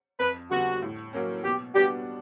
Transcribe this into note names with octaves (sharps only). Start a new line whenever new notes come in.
F2 B4
D3 G3 B3 F#4
A2
F#3 A#3 C#4
B2 G4
G3 B3 D4 F#4 G4